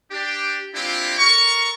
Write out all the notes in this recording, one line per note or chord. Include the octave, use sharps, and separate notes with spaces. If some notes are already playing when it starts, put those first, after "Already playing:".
D4 G4
G#3 C4 D4 E4 F4 G4
A4 A#4 A#5 C#6